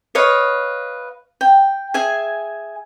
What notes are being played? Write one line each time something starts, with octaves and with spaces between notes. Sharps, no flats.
B4 C#5 D#5 F5
G5
G#4 E5 G#5